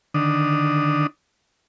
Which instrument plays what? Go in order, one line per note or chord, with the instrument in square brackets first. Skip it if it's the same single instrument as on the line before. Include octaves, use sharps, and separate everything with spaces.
[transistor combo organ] D3 D#3 D4 D#6